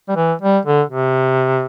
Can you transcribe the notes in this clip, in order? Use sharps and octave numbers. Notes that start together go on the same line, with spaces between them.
G3
E3
G3
D3
C3